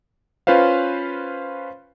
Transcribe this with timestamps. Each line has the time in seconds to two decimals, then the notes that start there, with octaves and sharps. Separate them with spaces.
0.47 C#4 F4 B4 C5 F5